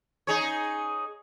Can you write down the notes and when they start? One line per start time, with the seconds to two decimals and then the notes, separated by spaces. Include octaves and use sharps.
0.27 D#4 G#4 C#5